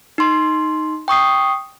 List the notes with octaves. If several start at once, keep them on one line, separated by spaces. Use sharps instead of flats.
D#4 C6
G5 C#6 D#6 C7